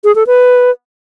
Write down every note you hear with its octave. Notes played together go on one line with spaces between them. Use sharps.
G#4
A4
B4